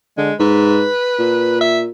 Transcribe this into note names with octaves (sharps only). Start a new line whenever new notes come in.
D3 G#3
G#2 B4
A#2
E5